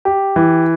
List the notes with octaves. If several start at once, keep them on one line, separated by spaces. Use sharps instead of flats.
G4
E3